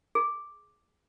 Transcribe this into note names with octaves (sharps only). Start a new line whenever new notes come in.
G#4